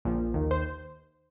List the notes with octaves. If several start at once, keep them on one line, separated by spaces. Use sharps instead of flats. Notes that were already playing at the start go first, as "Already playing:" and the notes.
A#1 A#2 F3
D#2 D#3
C5